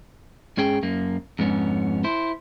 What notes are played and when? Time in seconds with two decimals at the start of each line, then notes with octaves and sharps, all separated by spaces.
0.57 G#2 C#4 G#4 G5
0.83 F#2 A#3
1.39 F2 G#2 B3 C#4
2.04 E4 C5